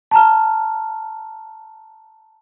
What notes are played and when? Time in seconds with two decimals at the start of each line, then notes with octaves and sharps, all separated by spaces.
0.11 A5 A#5 F6